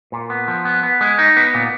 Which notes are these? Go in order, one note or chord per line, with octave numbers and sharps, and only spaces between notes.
A#2
B3
F3
B3
B3
G#3
D#4
B3
A#2